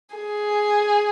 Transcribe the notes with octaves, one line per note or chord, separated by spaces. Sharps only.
G#4